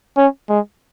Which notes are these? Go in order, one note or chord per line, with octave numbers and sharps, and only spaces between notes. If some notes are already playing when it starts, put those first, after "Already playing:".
C#4
G#3